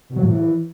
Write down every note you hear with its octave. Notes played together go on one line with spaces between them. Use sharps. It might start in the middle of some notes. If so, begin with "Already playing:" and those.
B2
F#3
A2
E3